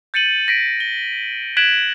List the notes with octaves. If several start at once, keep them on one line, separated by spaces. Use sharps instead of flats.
G6 A6 C#7 D#7 F#7
A#6 B6 D7
G7
F#6 G#6 B6 D7 E7 F#7